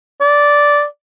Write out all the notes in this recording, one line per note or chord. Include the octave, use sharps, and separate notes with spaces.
D5